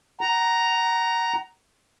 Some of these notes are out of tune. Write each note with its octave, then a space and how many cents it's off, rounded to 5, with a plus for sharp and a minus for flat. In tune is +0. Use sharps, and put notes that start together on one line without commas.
F#5 +30 A#5 +0